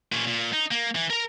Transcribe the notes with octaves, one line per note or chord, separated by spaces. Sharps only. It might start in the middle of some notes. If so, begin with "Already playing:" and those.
A#2 C#4
A#2
D#4
A#3
E3
A#4 A#5